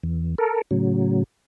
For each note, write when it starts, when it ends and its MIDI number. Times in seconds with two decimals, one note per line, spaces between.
0.03 0.35 40
0.38 0.61 69
0.38 0.61 70
0.71 1.23 45
0.71 1.23 49
0.71 1.23 54